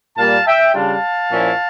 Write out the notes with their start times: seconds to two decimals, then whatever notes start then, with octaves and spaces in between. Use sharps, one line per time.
0.17 A#2 G3 A#3 F5 A5
0.46 E5 G5
0.74 C#3 G3 D4 F4 F5 A5
1.32 A#2 F3 C#4 E4